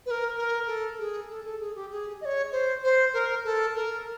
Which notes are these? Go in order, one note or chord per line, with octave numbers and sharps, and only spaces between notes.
B4
A#4
A#4
A4
G#4
A4
A4
G#4
G4
G#4
D#5
C#5
C5
C5
A#4
A4
A#4